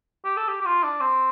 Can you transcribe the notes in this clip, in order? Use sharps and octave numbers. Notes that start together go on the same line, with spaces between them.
G4
A4
G4
G4
F4
D4
C4